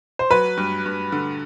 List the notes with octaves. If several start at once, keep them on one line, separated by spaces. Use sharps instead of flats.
C5
F#3 B4
G2
G2
D3